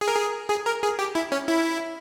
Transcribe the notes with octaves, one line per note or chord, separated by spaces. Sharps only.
G#4
A#4
G#4
G#4
A#4
G#4
G4
E4
C#4
E4